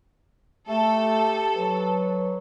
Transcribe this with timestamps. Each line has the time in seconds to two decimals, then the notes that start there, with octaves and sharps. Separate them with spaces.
0.69 A3 G4 A4
1.56 F#3 B4